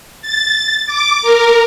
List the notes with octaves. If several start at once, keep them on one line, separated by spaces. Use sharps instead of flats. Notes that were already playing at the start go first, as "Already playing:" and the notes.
A6
D6
A#4